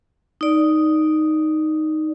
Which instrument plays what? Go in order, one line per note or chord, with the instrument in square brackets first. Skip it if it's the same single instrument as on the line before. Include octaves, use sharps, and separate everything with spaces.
[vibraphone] D#4 D5